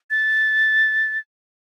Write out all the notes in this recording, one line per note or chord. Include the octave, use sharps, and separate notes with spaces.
A6